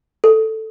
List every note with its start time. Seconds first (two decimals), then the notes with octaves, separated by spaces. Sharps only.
0.24 A4